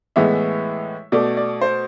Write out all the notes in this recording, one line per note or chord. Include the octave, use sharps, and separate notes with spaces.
A2 E3 G#3 B3 E5
B2 A3 D5
D5
C5